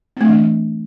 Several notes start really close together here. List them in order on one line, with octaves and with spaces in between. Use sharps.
C4 A3 D4 E3